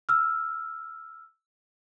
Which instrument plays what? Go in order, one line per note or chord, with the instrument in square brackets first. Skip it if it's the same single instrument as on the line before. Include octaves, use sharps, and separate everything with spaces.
[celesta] E6 F6